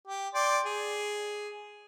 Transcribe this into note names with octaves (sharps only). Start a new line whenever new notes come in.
G4
D5 G5 C6
G#4